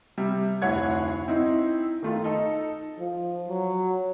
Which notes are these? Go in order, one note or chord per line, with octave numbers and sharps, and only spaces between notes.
C3 G3
F1 D2 E4 C#5 F#5 G#6
C4 D#4 E4
D#3 A3 F4
D#4 A4
F3
F#3